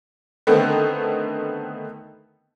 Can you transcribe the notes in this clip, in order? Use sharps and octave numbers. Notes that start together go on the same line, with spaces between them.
D3 D#3 A3 B3 C4